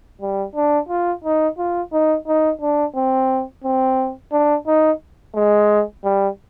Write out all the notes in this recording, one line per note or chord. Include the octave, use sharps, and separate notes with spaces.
G3
D4
F4
D#4
F4
D#4
D#4
D4
C4
C4
D4
D#4
G#3
G3